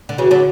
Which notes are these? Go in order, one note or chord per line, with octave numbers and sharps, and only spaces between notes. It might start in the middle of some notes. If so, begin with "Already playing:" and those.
D3
C#3 E3 F#4
D3 F#3